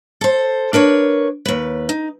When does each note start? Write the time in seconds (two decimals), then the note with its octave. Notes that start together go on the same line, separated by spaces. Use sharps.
0.21 A4 C5
0.73 D4 A#4 B4 C#5
1.45 D#2 B4
1.89 D#4